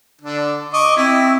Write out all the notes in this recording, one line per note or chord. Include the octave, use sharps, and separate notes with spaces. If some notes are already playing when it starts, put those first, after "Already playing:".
D3 D4
D#5 C#6 D6
C4 E4